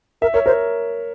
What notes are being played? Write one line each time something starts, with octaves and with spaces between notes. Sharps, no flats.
A#4 E5
A#4 C#5
A#4 C5